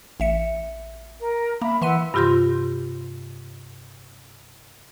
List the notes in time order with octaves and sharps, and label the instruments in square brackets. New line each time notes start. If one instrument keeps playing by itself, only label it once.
[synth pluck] A1 E5 C#7
[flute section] A#4
[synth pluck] A#3 [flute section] E5 B5
[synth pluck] E3 C6 D#7 [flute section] E4 F#5 B5
[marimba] G2 C3 F4 G4 C6 A#6